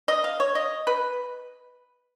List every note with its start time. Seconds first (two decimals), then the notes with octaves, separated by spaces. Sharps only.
0.08 D#5
0.24 F5
0.40 C#5
0.55 D#5
0.87 B4